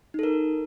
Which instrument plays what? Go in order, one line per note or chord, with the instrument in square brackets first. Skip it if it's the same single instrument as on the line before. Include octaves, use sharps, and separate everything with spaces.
[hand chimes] D#4
A4
A#4